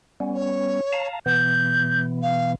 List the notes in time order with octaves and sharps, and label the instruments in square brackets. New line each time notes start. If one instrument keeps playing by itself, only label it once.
[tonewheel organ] G3 B3 C#4
[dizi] C#5
[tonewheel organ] F5 A5 A#5
[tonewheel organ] B2 E3 B3 [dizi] G6
[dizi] F5